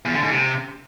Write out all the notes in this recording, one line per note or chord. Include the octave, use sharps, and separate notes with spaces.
E2
D3
G#2
C3